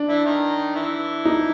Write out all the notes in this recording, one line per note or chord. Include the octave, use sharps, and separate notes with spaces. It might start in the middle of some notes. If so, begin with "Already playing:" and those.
Already playing: D4
E3 E4
D#3 D#4
E3 E4
D#4